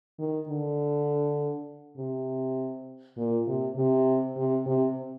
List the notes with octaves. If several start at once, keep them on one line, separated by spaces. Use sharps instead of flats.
D#3
D3
C3
A#2
C3
C3
C3
C3